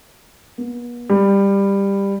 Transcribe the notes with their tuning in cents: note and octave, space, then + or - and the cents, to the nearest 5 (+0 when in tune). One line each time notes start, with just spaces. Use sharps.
B3 -40
G3 +15